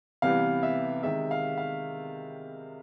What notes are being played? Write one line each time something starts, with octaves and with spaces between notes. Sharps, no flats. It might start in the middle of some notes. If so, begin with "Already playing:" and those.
C3 E3 G3 B3 F5
E5
C3 D#3 G#3 E5
F5
F5